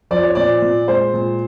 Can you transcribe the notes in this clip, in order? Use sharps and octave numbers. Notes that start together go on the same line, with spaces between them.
F3 D5
C#5
A#2 D5
A#2
G#3 C5
A#2